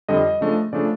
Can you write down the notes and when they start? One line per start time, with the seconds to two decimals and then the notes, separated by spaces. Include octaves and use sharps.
0.09 F2 D3 G3 D#5
0.41 C#3 F3 A3 D4
0.73 C#3 F3 A3 D4 D5